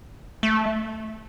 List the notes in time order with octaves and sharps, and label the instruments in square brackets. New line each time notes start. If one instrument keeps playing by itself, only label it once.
[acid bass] A3